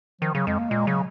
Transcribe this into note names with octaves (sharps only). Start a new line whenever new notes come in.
D#3 F3
C#3 F#3
F2 G#3
A#3
A#2 G#3
C#3 F#3